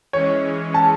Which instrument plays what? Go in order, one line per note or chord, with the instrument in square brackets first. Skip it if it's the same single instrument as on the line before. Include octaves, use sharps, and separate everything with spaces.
[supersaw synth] E3 G#3 C#4 [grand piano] C#5
[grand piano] A5